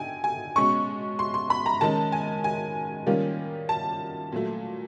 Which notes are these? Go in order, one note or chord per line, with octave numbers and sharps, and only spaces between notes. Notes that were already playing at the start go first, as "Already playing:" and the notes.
Already playing: D3 D#4 G5 G#5
G#5
B2 G#3 C#4 C#6
C6
C6
B5
A#5
D#3 G#3 C#4 A5
G#5
G#5
D#3 G3 A#3 C#4 F4
A5
A#2 F#3 A3